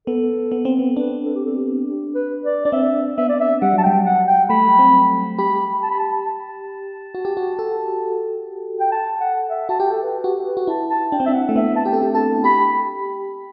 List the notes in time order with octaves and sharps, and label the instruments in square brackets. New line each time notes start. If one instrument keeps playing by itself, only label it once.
[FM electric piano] B3 [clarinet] A4
[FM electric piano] B3
C4
B3
[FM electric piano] D4 [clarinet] B4
[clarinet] A4
G4
A4
G4
G4
B4
D5
[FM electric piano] D4 [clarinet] D5
[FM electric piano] C4 [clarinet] E5
[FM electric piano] B3 [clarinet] E5
[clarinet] D5
E5
[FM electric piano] G3 [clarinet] F#5
[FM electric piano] F#3 [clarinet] A5
[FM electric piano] G3 [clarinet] G5
[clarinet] F#5
G5
[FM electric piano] A3 [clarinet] B5
[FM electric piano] C4
[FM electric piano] G4 [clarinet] B5
[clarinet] A5
B5
A5
A5
[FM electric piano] F#4
G4
F#4
A4
[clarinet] G5
A5
F#5
E5
[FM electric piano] F#4 [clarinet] A5
[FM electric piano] G4 [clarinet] G5
[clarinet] A4
B4
[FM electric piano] F#4 [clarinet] G4
[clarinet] B4
[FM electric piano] F#4
[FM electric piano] E4 [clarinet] A5
[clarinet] A5
[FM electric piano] D4 [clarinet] G5
[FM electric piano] C4
[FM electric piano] D4 [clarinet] E5
[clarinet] F#5
[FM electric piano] A3
[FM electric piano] B3 [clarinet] E5
[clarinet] A5
[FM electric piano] G4 [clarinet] G5
[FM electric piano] A4
G4
[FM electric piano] A4 [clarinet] A5
[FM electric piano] G4 [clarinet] B5